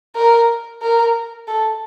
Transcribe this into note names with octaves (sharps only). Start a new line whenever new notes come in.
A#4
A#4
A4